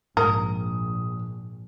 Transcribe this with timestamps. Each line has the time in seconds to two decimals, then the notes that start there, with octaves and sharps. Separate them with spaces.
0.17 A#1 G#2 A#4 D#6